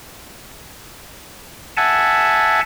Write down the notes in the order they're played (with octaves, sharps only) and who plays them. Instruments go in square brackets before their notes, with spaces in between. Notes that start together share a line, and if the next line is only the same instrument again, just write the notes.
[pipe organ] E5 F#5 G#5 A5